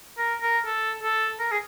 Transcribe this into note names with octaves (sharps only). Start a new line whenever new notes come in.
A#4
A#4
A4
A4
A#4
G#4